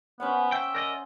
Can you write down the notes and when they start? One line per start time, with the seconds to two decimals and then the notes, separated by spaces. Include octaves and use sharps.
0.20 B3 C#4 C5 F#5
0.52 E5 G5
0.74 A#4 D5 D#5